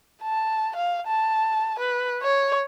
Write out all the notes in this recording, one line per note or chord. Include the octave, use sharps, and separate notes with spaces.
A5
F5
A5
B4
C#5